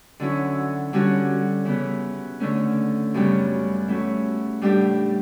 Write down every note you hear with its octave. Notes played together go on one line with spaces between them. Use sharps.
D3 F#3 C#4 E4
D3 G3 C#4 F#4
C#3 E3 B3 E4
D3 A3 C#4
F#2 C#3 G3 B3
E3 A3 C#4 F#4
A2 G3 D4 G4